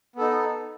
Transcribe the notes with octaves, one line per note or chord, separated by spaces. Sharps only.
B3 D#4 A4